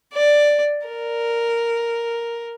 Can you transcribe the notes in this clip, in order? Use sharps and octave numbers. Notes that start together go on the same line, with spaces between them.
D5
A#4